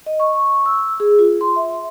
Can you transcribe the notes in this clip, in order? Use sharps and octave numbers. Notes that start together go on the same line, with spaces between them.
D#5
C#6
E6
G#4
F4
C6
E5